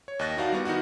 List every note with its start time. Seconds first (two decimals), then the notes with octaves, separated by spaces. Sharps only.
0.08 C#5
0.19 D#2 D#5 F#6 A6 A#6
0.37 D#4 E4 F#4 D5 F5 A5
0.52 G3 B3
0.65 D#3 B3 D#4 E4 F#4